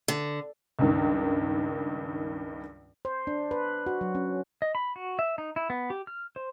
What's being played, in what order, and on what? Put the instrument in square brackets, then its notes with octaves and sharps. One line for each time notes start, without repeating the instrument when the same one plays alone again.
[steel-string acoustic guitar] D3
[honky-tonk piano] C#2 G2 D#3
[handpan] C5
D4
B4
F#4
F#3
C#4
[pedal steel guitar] D#5
B5
F#4
E5
D#4
E4
B3
G4
F6
C5